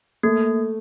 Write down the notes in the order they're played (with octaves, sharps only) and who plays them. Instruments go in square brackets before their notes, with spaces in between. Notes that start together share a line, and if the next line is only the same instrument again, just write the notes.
[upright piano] A3 [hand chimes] A#3